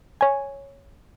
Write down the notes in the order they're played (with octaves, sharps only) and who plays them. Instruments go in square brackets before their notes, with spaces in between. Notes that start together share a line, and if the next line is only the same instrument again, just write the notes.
[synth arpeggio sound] C#5 G#5